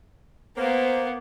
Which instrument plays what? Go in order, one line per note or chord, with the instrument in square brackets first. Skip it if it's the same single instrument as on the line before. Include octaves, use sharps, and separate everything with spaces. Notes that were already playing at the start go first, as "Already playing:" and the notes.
[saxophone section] A#3 [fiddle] B3 [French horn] C5